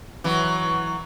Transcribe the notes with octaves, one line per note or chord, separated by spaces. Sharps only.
E3 F#3